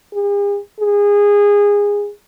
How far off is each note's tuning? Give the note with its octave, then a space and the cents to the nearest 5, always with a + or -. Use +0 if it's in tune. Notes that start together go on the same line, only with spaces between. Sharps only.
G#4 -45
G#4 -20